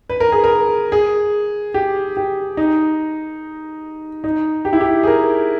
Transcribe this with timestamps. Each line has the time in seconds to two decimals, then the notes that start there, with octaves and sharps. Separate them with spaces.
0.10 B4
0.20 A#4
0.32 G#4
0.44 A#4
0.92 G#4
1.74 G4
2.17 G4
2.57 D#4
4.24 D#4
4.65 G4
4.73 E4
4.81 G4
5.03 G#4
5.07 A#4